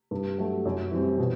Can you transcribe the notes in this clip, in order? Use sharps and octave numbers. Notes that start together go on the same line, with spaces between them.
G2
F#3 A3
F#2
E3 G3 C4
B2